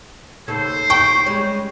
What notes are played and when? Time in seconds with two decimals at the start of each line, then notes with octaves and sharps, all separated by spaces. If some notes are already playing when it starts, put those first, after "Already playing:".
0.48 D#2 C#3 A4 C5
0.90 G5 C#6
1.26 G3 G#3 C#4